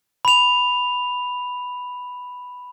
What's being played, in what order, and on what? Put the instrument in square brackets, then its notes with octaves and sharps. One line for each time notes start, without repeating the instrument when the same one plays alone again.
[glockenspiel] B5 F7